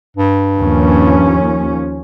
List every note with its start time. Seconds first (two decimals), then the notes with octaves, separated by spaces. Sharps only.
0.17 G2
0.58 D#2 F3 C#4